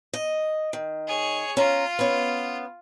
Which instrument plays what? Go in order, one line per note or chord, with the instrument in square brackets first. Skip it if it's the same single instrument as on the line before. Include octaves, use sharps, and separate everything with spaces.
[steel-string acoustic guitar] D#5
D#3
[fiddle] G#4 C#5
[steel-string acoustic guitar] C#4 A#5 [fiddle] F4
[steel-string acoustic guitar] B3 C#4